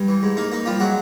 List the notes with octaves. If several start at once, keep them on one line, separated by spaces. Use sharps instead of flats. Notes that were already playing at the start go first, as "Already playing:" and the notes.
Already playing: G2
E3
G#2
A#3 D#4
A#3 D#4
F3 G3 F4
F#3 G#3 F#4